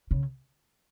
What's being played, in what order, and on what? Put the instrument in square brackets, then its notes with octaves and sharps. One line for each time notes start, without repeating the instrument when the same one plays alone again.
[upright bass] C#3